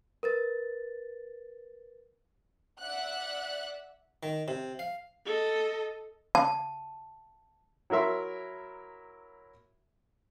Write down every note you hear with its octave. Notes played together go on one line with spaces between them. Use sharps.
A#4 B4 A6
D5 E5 F#5 F#6
D#3
C3
F5
A4 D#5
A5
F#3 E4 A#4 E5 C6